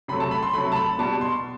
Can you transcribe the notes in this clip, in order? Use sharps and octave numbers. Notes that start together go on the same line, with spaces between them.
C3 F#3 A3 B5
A5
B5
C6
C3 F#3 A3 B5
A5
B5
B2 G3 B3 A5
C6